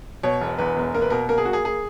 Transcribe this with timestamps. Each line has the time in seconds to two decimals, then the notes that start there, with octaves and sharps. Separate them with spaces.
0.23 B2 C#5
0.41 E1
0.58 E2 B4
0.77 E1
0.94 A#3 A#4
1.02 B4
1.10 B2 A#4
1.29 A#3 A#4
1.38 G#4
1.45 A#3 F#4
1.53 G#4
1.65 G#4